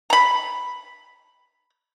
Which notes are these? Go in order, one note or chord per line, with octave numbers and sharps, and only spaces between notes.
A#5 B5